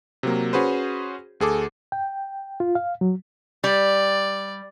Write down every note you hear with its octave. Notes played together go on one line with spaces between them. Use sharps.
C3 F#3 A#3
C#4 F#4 G#4 B4 C5
D2 G#4 A4 D6
G5
F4
F5
F#3
G3 D5